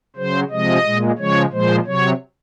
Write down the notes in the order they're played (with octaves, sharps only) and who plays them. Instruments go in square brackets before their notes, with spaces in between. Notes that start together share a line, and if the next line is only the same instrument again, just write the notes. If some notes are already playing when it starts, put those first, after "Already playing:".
[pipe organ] C#3 F#3 C5
C3 F3 G#3 D#5
A#2 G#3
C#3 F3 G#3 C#5
A#2 F3 G#3 C5
C3 F#3 C#5